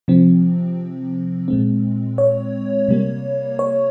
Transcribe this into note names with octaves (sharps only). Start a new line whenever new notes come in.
C3 F3 C4
A#2 G#3 C4
C#5
C3 G3 A#3
C#5